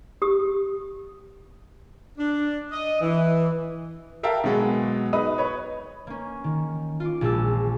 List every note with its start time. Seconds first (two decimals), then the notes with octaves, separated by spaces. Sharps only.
0.22 G4 D#6
2.18 D4
2.72 D#5
3.01 E3
4.23 A#4 E5 F5 G5 A5 A#5
4.44 B2 F#3 G#3 B3
5.13 D#4 B4 D#6
5.38 B4 C#5
6.07 A#3 C#4
6.44 D#3
7.00 F4 D6
7.21 A#1 A#2 G#3 F#4 A5 E6